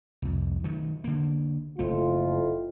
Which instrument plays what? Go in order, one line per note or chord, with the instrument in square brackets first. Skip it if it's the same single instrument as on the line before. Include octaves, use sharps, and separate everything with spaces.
[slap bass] C2 F2
D#3 F#3 A3
D3 A#3
[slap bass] F#1 A3 [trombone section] F2 A2 F4